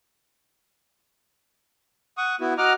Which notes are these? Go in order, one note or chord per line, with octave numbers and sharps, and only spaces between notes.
F#5 C#6 D#6
B3 E4 F#4
F#4 D#5 F#5 A#5 D6 F6